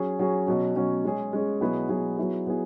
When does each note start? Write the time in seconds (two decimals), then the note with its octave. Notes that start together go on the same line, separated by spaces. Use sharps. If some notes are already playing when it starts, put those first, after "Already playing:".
Already playing: F#3 C#4 G#4
0.19 F#3 C#4 G#4
0.47 B2 F#3 C#4
0.76 B2 F#3 C#4
1.05 G#3 C#4 G#4
1.33 G#3 C#4 G#4
1.61 B2 F#3 B3 E4 G#4
1.89 B2 F#3 B3 E4 G#4
2.18 F#3 B3 E4 G#4
2.47 F#3 B3 E4 G#4